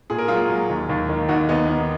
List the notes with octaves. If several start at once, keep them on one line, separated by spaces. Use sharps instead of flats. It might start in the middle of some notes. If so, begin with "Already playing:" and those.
A#2 G#4
A#4
F#3 F4 G#4
F#3
D#2
D#2
D#3
D#2 D#4 F#4
D#2 B3 D#4
D#3